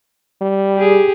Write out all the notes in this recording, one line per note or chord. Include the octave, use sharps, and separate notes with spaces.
G3
G4 G#4